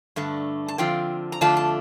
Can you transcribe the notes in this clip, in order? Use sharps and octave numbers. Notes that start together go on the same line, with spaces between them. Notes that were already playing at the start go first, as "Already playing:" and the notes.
G2 D3 A3
A5
D3 F3 C4 F4 G5
A#5
F2 D3 A3 D4 F4 A5
A5